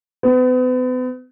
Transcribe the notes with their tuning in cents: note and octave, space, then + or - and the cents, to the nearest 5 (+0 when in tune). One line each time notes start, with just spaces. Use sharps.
B3 +40